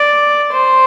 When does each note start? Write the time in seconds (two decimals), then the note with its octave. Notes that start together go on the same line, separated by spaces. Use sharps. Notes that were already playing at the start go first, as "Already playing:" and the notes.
Already playing: D5
0.53 C5